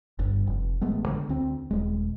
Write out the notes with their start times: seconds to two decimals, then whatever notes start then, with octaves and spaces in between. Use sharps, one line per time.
0.19 G1 G2
0.47 F1
0.81 A1 G#3 A3 B3
1.08 D3
1.29 D2 C4
1.71 D#1 G#3